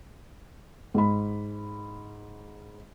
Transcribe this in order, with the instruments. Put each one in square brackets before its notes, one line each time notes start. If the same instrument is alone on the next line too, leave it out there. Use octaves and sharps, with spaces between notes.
[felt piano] G#2 B5